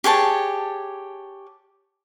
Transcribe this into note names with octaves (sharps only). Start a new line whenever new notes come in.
G4 G#4 C#5 A5